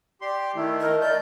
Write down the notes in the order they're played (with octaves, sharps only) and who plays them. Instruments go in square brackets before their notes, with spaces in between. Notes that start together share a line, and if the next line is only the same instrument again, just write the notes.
[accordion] G4 C6 [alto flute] D5
[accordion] D#3 A3 [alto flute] E4
[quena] A#4 [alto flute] D#5
[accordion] A3 G6 [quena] D5